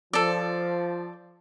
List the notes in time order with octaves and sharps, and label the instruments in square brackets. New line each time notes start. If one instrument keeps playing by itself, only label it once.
[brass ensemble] F3 [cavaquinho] A4 D5